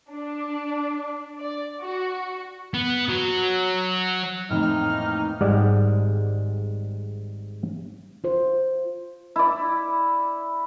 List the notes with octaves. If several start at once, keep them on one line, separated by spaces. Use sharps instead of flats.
D4
D5
F#4
B3
F#3
F2 A2 D#3 E3 A#3 D#4 F6
G#1 G#2 G3 G#3 D5 F#5
F4 C5
E4 D5